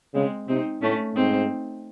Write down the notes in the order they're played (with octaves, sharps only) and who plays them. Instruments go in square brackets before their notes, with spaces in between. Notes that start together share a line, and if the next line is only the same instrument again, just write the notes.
[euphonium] C#3 [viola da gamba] G#3 C4
[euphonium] C3 [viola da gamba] C4 D#4
[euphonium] A2 [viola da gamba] A3 C#4
[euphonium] G#2 [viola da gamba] C4 D#4